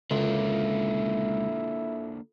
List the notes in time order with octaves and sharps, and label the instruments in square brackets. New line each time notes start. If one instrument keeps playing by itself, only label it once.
[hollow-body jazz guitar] C#2 [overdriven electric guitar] D3 A#3 [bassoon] E4 [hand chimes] F4 A4